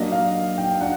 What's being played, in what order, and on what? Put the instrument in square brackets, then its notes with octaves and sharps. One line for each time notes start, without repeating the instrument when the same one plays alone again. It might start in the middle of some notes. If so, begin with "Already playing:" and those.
Already playing: [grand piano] F#3 A#3 D4 [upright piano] D#5
[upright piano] F5
G5
[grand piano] D4 [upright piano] F#5